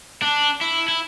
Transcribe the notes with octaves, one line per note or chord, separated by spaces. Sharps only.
D4
E4
E4